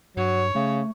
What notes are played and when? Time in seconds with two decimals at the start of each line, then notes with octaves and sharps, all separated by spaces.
0.17 G2 F#3 C#5
0.55 C#3 A3